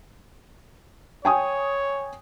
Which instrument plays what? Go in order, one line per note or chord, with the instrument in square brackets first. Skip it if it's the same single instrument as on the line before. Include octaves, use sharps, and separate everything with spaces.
[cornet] C#5 [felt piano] G5 G#5 D#6